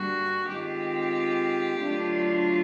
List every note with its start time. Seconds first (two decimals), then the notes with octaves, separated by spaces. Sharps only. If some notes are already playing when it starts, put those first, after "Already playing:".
Already playing: G2 D3 G3 A#3 F#4
0.48 D#3 G#3 C4 F4 G4
1.79 D3 F#3 A3 D4 F4